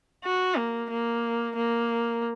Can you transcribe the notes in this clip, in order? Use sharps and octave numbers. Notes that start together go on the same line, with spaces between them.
F#4
A#3
A#3
A#3